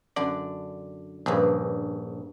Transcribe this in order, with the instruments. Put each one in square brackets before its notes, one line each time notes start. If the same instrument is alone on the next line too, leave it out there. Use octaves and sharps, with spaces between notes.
[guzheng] F#2 D3 [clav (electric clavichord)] D5
[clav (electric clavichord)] A#1 C#3 [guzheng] G2 G#4